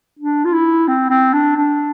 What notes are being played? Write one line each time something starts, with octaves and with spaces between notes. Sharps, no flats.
D4
F4
E4
C4
C4
D4
D4